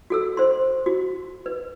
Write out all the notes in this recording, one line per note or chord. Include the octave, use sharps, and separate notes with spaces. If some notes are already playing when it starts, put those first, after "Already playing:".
F#4 A4 E6
C5 C6
F#4
B4